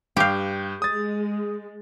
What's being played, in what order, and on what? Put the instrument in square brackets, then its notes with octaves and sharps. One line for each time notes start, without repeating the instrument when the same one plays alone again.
[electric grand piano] G2 G5 G6 [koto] G4 F5
[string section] G#3 [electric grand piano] D#6 A6